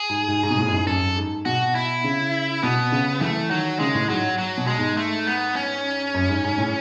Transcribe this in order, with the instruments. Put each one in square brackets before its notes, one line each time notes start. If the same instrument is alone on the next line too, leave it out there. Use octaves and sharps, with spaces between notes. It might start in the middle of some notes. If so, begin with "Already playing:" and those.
Already playing: [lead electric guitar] G#4
[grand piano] G#2
G#2
G#2
B2
A2
F#2
G#2
[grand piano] F#2 [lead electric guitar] A4
[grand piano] G#2
[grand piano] B2 [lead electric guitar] F#4
[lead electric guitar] E4
[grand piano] C#3
[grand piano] B2 [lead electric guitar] B3
[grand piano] C#3
[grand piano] E3 [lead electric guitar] A3
[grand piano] D#3 [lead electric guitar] F#3
[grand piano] C#3 [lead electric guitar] G#3
[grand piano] A2
[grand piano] G#2 [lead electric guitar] F#3
[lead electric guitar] F#3
[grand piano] B2
[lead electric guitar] G#3
[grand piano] G#2
[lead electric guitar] A3
B3
C#4
[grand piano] F#2
G#2
G#2
A2